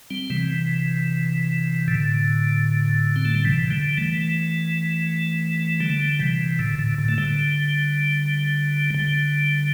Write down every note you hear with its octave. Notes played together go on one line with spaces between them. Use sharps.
G3 C4
C3 E3
A2 D3
C4
A3
G3
C3 E3
D3 G3
E3 A3
D3 G3
C3 E3
A2 D3
A2 D3
A2 D3
A3
D3 G3
D3 G3